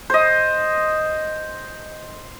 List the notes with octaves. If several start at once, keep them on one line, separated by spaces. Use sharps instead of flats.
C5 D#5